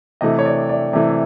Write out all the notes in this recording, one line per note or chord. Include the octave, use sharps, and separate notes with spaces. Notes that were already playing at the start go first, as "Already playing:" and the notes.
C3 E3 A3 D#5
C#5
D5
D5
C3 E3 A3